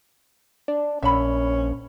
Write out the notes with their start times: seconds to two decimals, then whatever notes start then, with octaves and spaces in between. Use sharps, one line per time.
0.68 D4
1.03 A#1 C#4 E5 B5